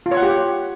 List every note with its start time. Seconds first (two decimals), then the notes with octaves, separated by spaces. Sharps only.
0.06 F4
0.11 C#5
0.17 F#5
0.23 G4